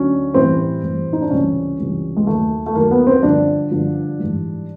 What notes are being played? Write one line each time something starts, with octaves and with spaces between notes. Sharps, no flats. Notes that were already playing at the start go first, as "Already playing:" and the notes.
Already playing: D2 D3 F#3 C#4
A2 E3 G3 C4
A2 E3 G3
D#4
D4
C#2 C3 E3 G3 C#4
C#2 C3 E3 G3
G#3
D#2 D#3 F#3 A3
A3
D#2 D#3 F#3 A#3
B3
C4
G2 D3 F3 D4
G2 D3 F3
G#2 E3 G3